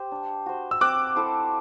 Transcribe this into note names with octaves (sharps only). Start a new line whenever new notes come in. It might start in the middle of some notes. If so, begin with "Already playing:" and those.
Already playing: G4 C5
D4
F#4 C5
E6
C4 D6 F#6
E4 A4 C5